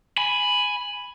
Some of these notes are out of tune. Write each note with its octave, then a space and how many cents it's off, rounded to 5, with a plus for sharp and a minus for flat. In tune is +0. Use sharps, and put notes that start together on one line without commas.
G#5 +0 B5 +0